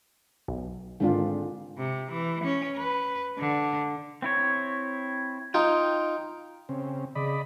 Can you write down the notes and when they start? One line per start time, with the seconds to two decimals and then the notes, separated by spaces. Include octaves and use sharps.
0.48 B1
1.00 G#2 D3 D#3 C4 D4 F4
1.77 C3
2.12 E3
2.44 C#4
2.77 B4
3.39 D3
4.22 C4 E4 C#5
5.54 D#4 F4 G5
6.69 C#3 C4
7.15 C#3 D5 D#5 B5